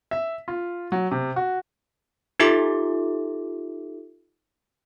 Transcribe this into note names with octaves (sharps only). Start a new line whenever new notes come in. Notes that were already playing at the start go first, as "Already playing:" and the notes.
E5
F4
F#3
C3
F#4
D#4 F4 G4 A4 E5 D6